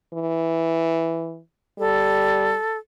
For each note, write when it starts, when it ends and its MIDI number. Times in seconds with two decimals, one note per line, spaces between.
0.14 1.40 52
1.79 2.55 55
1.79 2.78 69